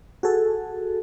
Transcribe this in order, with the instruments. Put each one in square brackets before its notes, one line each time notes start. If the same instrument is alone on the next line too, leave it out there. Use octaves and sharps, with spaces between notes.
[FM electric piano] F#4 G#4 A4